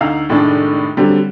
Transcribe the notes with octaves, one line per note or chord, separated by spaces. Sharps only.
D2 D#4 F5 A#5 E6
F1 A2 D#3 G#3 D4
D3 F#3 G3 C4